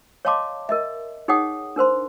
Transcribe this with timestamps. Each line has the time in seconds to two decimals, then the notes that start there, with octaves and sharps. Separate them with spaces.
0.25 C#5 D#5 F5 A5 C6 D6
0.69 A#4 D#5 E5
1.28 D#4 G#4 C#5 F#5 G5 D#6
1.76 D4 A#4 C5 C6